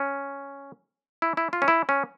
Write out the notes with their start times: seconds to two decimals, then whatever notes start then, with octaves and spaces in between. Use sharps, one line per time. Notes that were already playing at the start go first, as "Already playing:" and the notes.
Already playing: C#4
1.22 E4
1.37 E4
1.53 F4
1.62 C#4
1.68 E4
1.89 C#4